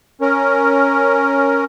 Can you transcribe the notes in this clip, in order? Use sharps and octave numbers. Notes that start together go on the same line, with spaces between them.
C#4 A#4